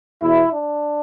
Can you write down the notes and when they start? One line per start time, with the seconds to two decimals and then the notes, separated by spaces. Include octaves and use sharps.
0.22 E2 B2 E4
0.51 D4